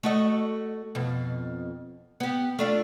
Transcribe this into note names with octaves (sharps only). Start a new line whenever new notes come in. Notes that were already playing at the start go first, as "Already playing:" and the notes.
A3 F#4 D#5
F2 B2
B3 G4
A3 D4 F4